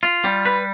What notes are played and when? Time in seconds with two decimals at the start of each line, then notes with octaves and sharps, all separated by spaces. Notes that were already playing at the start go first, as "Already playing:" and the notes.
0.03 F4
0.24 G3
0.45 B4